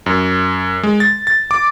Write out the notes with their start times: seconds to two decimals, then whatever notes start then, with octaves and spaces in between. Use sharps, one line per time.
0.06 F#2
0.83 G#3
1.00 A6
1.27 A6
1.51 D6